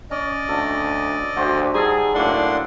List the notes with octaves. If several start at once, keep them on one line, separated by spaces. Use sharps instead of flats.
C#4 D5 D#5
D2 A4
D2 F#4 G4 C5
G3 D#4 G#4 A4
F#2 A2 A#3 D4 D5 F#5 C6